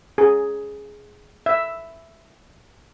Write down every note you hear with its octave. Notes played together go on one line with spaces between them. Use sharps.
G#4
E5